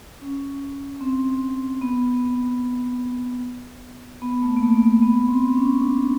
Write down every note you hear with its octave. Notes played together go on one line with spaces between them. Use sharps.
C#4
C4
B3
B3
A3
A#3
A3
A#3
B3
C4
C#4
D4